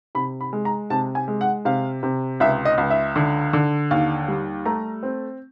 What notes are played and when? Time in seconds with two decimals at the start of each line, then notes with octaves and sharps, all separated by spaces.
0.15 C3 B5
0.41 B5
0.53 G#3
0.65 A#5
0.90 C3 A5
1.15 G#5
1.28 G#3
1.41 F#5
1.65 C3 F5
2.03 C3
2.40 C#2 E5
2.65 D#5
2.78 C#2
2.90 E5
3.16 D3
3.53 D3
3.91 D#2 F5
4.28 G3
4.66 A3 A#5
5.03 C4